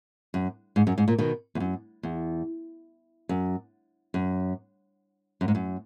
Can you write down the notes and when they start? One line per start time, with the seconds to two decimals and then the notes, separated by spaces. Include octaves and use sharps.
0.34 F#2
0.76 G#2
0.87 F#2
0.98 G#2
1.08 A#2
1.18 B2 D#3
1.55 E2
1.60 F#2
2.03 E2
3.29 F#2
4.14 F#2
5.41 F#2
5.48 G#2
5.55 F#2